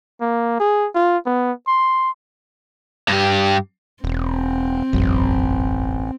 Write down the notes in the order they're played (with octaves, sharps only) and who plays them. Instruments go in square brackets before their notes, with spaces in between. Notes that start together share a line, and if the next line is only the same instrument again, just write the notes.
[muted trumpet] A#3
G#4
F4
B3
C6
[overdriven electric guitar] G2 G4
[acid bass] E1 [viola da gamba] C4
[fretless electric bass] E1 F#2 [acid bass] A1